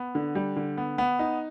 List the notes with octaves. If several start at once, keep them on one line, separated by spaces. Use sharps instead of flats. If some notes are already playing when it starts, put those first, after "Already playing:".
Already playing: B3
D3
G3
D3
B3
B3
D#4